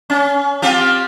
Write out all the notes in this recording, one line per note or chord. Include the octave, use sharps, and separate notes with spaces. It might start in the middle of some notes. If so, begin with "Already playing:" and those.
C#4
C4 F4 G4